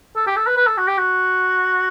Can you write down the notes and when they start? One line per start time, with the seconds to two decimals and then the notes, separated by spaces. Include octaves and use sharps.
0.16 A4
0.27 G4
0.36 A4
0.47 B4
0.57 B4
0.67 A4
0.77 F#4
0.88 G4
0.98 F#4